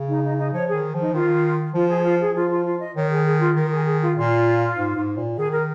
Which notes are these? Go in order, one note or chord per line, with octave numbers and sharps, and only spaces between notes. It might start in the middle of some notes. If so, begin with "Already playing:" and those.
Already playing: C#3
D#4
D#4
D#4
F3 C#5
D#3 G#4
F3
D#4
D#3 F4
F3 F4
G#4
F4
G#4
F3 F4
F4
F4
D#5
D#3 C#5
G#4
G#4
F4
D#3 A#4
G#4
G#4
F4
A#2 F4
G#2
G#2
A#2
D#3 G#4
A#4